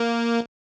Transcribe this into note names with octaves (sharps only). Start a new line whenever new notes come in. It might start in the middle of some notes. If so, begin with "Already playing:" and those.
Already playing: A#3